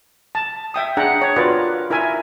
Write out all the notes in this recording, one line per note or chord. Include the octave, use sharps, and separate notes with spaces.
A5
E5 G5 D#6
D4 G#4 F#5 G5 A#5
C#5
F4 F#4 A#4 B4 D5
E4 A#4 E5 G#5